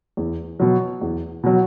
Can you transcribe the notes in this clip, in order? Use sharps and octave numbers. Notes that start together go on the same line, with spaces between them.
E2
B2 F#3
E2
B2 F#3